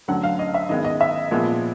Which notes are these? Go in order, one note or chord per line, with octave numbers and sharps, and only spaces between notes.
D3 F#3 A3 F#5
F5
D#5
E5
D#3 G#3 B3 D#5
D#5
E5
A#2 F3 G#3 B3